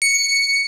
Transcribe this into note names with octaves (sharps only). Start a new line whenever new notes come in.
C#7